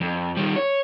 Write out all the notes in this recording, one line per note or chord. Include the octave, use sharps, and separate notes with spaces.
F2
D#3 G3
C#5